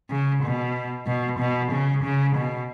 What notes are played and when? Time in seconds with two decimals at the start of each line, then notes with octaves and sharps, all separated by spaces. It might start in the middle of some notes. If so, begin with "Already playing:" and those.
0.10 C#3
0.43 B2
1.06 B2
1.39 B2
1.72 C#3
2.04 C#3
2.36 B2